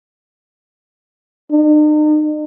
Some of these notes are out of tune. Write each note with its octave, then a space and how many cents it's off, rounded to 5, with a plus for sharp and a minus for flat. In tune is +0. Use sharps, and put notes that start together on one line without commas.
D#4 -45